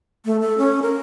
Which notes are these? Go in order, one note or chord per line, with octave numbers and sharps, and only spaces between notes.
A3
A4
C#4
A#4